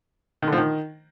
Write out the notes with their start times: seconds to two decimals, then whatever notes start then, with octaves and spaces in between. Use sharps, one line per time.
0.42 D#3
0.47 D3
0.53 F3
0.58 D#3